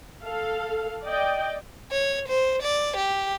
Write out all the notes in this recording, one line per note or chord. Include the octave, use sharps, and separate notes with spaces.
A4 F5
D5 D#5 G5
C#5
C5
D5
G4